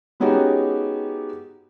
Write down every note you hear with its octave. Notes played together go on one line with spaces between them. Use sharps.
G#3 B3 C#4 D#4 F#4 G4